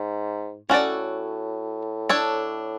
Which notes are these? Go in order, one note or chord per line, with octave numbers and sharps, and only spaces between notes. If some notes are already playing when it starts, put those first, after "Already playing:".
Already playing: G#2
A2 C#4 F#4 A4 D5
D4 A4 C#5